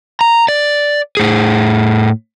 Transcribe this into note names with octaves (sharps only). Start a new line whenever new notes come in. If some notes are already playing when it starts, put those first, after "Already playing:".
A#5
D5
A2 G#4